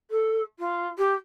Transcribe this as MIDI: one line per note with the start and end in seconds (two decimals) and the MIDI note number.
0.10 0.41 69
0.59 0.88 65
0.98 1.13 67